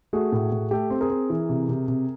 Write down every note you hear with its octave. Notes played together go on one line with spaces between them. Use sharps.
A3 F#4 G#4
A2
A2
A3 G4 A4
C4
G#4 A#4
C4
E3
C3
C3
C3